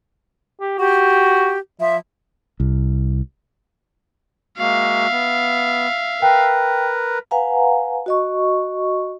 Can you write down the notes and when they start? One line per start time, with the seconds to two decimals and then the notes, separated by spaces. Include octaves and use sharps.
0.61 G4
0.79 F#4 G4
1.80 F3 E5
2.60 C2
4.59 G#3 A#3 F#4 E5 F5
5.11 B3
6.22 A#4 B4 G5
7.31 B4 F5 F#5 G#5 A#5
8.06 F#4 D#5 C#6